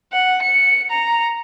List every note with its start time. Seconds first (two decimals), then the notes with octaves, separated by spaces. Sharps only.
0.12 F#5
0.42 C#7
0.90 A#5